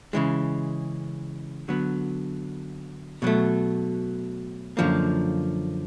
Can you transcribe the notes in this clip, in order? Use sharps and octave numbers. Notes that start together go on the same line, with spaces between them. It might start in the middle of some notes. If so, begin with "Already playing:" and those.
C#3 E3 G#3
D3 F#3 B3
B2 F#3 A3
F#2 D3 F3 A#3